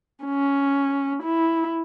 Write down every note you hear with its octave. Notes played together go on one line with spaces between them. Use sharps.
C#4
E4